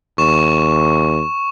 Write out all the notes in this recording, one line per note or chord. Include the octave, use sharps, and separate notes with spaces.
D#2 C#6 E7